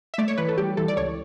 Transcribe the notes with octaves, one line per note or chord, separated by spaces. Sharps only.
E5
A3 D5
C#5
E3 B4
A4
G3 G4
E3 A4
D5
C#2 C#5